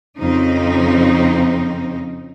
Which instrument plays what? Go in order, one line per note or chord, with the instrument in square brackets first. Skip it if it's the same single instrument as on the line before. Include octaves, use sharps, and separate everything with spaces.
[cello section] F2 C#3 C4 D#4